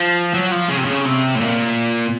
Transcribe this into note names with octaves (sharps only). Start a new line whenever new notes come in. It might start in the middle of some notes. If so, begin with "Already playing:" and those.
Already playing: F3
F#3
F3
C#3
C3
C#3
C3
A2
A#2